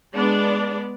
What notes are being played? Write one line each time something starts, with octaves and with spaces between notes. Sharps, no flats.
G#3 B3 D4 D5